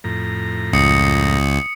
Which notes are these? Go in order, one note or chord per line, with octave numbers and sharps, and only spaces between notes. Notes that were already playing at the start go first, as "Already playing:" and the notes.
F2 A2 A#5
C#2 D#6 C7 C#7